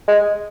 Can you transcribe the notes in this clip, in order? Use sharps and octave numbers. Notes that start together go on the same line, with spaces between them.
G#3